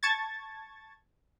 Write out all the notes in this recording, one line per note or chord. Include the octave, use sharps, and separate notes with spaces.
A5 C#6 G#6 A6